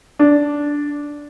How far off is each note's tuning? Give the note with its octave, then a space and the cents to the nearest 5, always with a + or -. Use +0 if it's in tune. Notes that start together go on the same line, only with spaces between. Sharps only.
D4 -10